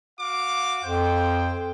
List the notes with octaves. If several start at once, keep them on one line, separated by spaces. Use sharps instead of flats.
F#4 F5 D6
F2 C5 G5